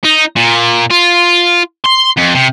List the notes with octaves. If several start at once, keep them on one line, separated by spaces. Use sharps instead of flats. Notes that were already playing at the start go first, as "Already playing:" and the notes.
D#4
A#2
F4
C6
F2
C3